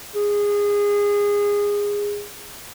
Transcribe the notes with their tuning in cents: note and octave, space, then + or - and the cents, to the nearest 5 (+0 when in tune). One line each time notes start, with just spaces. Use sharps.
G#4 -20